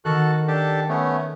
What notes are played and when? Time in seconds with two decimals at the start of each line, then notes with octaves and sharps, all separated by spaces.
0.05 D#3 F#4 A4 F#5 F6 F#6
0.48 D4 G4 A4
0.89 A3 B3 C#4